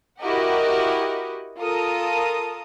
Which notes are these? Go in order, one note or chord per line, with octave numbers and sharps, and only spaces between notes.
E4 F#4 G4 A#4 D#5 F#5
F4 A4 A#4 A#5 D#6